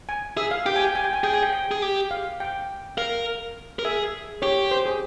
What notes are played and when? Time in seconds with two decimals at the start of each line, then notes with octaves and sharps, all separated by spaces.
0.09 G#5
0.37 G#4 E5
0.51 F5
0.66 G4 G5
0.76 G#5
0.85 G5
0.95 G#5
1.04 G5
1.13 G#5
1.23 G#4 G5
1.33 G#5
1.43 G5
1.53 G5
1.71 G#4
1.82 G4
2.11 F5
2.40 G5
2.97 A#4 F5
3.79 A#4
3.85 G#4 E5
4.42 G4 C#5
4.71 C5
4.86 G#4